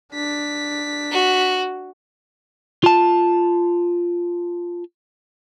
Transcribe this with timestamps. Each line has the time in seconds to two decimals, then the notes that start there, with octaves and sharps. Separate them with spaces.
0.14 D4 B6
1.12 F#4
2.84 F4 A5